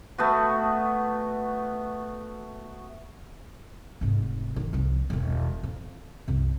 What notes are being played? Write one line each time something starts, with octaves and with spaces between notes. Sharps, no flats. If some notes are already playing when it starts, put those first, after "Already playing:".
A3 B3 F#4
F1 G#2
D#3
C2 F3
E1 D#3
F2
C2 F#2